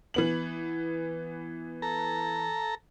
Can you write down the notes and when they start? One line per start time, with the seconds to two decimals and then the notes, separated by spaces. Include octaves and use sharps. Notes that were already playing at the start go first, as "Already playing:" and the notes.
0.14 E3 B3 F#7
1.82 A4 A#5